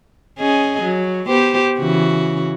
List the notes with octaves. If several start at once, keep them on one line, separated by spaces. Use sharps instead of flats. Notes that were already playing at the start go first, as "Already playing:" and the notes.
C#4 G#4 D#5
F#3
B3 G4 C5
C#3 E3 F#4